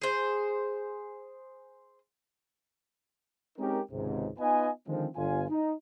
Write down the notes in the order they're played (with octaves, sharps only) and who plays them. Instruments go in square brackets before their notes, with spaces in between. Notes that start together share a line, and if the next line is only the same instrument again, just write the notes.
[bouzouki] G#4 C5
[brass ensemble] G#3 C4 C#4 D#4 G4 A#4
G#1 C#2 G#2 C3
B3 D#4 F4 B4 D#5 G#5
D3 D#3 F3 G#3 C4
G1 F4 G#5
D#4